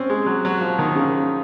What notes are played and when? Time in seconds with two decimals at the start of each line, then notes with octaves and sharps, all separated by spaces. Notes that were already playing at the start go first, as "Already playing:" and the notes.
Already playing: C4 C#4
0.10 G#3
0.26 F#3
0.45 F#3
0.61 F3
0.79 D#3
0.95 C#3